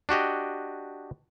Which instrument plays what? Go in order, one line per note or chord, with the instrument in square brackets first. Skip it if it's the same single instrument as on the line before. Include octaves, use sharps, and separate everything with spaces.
[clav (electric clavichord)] D4 F#4 G4 D#5